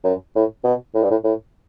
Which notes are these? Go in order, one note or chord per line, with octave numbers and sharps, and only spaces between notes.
F#2
A2
B2
A2
G2
A2
A2